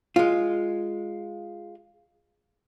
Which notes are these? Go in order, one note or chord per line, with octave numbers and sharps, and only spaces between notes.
G#3 F4